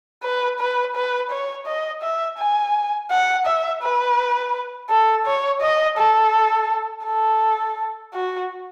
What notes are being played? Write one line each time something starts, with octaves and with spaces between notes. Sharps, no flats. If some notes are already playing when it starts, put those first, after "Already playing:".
B4
B4
B4
C#5
D#5
E5
G#5
F#5
E5
B4
A4
C#5
D#5
A4
A4
F#4